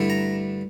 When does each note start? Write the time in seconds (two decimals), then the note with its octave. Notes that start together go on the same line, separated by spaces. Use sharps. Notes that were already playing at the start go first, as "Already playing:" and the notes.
Already playing: G2 D3 A3 E4
0.10 A#5